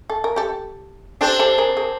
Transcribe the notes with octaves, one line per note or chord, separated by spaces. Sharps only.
A4
A#4
G4 A4
C4 D4 G4 A4
G4 A4
G#4 A#4
G#4 A#4